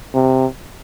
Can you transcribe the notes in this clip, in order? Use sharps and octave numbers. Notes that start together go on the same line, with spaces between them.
C3